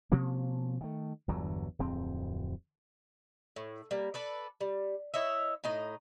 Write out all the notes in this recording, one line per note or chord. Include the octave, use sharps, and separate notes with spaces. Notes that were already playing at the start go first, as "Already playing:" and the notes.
B2 F3 A#3 C#4
D#3 A3
G1 E2 D3 F#3
D1 F2 C4
A2
G3 A#3
A4 B4 D5
G3
E4 C#5 D#5 E5
A2 D#4 D#5